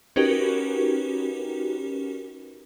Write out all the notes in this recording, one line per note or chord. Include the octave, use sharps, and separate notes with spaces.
C#4 D#4 F#4 G4 A#4 B4